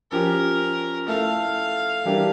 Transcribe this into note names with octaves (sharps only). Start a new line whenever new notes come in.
F3 C#4 G4 A#4
A3 E4 A4 F5
E3 G3 D4 G4 A#4